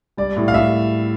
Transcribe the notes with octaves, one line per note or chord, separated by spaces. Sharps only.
G3 D5
A2
F5
A2 E5